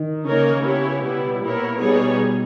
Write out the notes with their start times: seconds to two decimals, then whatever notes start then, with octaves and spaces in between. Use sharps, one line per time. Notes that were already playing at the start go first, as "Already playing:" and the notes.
Already playing: D#3
0.25 C#3 A#3 D#4 A#4 C#5
0.64 B3 E4 G4 C#5
1.02 B2 G3 B3 E4 G4
1.41 A#2 B3 E4 A#4 C#5
1.79 B2 G3 B3 D#4 G#4 C#5